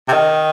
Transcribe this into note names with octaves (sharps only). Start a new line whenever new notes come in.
C3
D#3